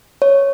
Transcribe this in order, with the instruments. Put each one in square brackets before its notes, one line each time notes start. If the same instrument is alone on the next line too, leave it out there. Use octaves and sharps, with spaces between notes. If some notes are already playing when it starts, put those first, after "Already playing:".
[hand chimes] C#5